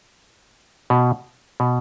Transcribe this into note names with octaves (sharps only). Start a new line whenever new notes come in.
B2
B2